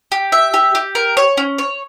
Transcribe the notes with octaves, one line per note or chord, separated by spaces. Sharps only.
G4
E5
G4
G4
A#4
C#5
C#4
C#5